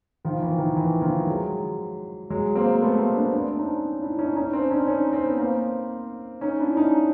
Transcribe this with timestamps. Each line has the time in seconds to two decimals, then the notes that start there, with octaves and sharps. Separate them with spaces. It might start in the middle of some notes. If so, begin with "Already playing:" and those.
0.25 D#3 F3
0.42 E3
0.58 D#3
0.77 E3
1.02 D#3 F3
1.27 F#3 G#3
2.30 F#3 G#3
2.55 A#3 C4
2.81 A3 B3
2.98 A#3 C4
3.16 C4 D4
3.33 C4 D4
3.59 C#4 D#4
4.01 D4 E4
4.19 C#4 D#4
4.36 C#4 D#4
4.53 C4 D4
4.70 C#4 D#4
4.87 C#4 D#4
5.13 C4
5.25 B3
5.38 A#3 C4
6.41 C#4 D#4
6.59 D4 E4
6.76 C#4 D#4